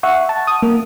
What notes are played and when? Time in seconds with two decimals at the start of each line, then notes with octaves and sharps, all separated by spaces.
0.03 E5 F#5 C#6
0.29 A5
0.47 D#6
0.63 A#3